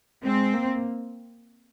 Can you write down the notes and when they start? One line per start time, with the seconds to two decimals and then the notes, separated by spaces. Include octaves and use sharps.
0.25 G#3 C4
0.54 A#3